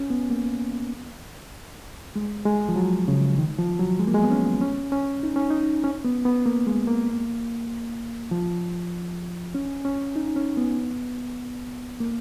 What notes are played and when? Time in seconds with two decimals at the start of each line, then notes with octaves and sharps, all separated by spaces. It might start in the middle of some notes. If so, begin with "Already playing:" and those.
Already playing: C#4
0.10 B3
0.30 A#3
2.16 G#3
2.45 G#3
2.69 F3
2.76 F#3
3.08 C#3
3.38 D#3
3.59 F3
3.79 F#3
3.99 G#3
4.07 A#3
4.14 G#3
4.24 B3
4.31 C#4
4.61 C#4
4.92 C#4
5.23 D#4
5.36 C#4
5.50 D#4
5.84 C#4
6.05 B3
6.25 B3
6.46 A#3
6.67 G#3
6.87 A#3
8.31 F3
9.55 C#4
9.85 C#4
10.16 D#4
10.36 C#4
10.57 B3
12.00 A#3